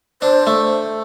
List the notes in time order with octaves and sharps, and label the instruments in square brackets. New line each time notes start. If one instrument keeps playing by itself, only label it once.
[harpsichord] D4 [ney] C5
[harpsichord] A3